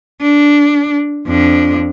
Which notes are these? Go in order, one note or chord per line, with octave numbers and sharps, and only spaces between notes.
D4
F2 D4